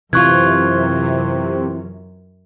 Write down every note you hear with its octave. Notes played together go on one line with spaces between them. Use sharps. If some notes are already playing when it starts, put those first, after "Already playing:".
F#2 C3 E3 F4 C#6 F#6 G#6